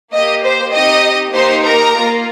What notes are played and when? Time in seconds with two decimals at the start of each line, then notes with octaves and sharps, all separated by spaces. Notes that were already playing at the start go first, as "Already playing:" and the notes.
0.13 A#3 G4 D#5
0.44 C5
0.73 C4 D#4 G4 D#5
1.34 A#3 D#4 G4 C5 C6
1.64 A#4 A#5
1.95 A#3 F4